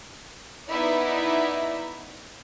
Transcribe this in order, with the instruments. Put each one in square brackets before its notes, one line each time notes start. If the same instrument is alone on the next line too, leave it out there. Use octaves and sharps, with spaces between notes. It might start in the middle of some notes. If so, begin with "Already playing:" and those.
[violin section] B3 D#4 E4 D5 E5